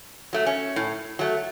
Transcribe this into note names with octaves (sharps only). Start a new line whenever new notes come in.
F#3 A3
C#4
A2
F#3 A3